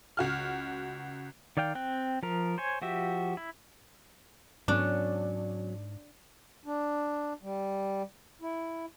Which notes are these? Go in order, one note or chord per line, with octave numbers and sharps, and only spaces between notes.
C#2 F#4 F6
D#3 D5 F5 G5
C4 G5 F#6
F3 A#4
C5 C#5 G#5
F3 F#4 G4 E5
E4
G#2 F#3 B3 C#4 D4
D4
G3
E4